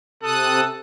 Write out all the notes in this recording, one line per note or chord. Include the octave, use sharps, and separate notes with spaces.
C3 A4 D#6 F#6